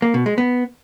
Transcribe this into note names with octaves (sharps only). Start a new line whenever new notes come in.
A#3
B2
G#3
B3